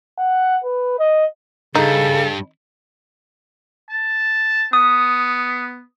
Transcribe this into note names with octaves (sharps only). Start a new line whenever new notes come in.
F#5
B4
D#5
G2 C#3 D#4 A4
A5
B3 D#6